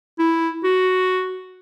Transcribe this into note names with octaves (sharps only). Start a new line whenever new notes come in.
E4
F#4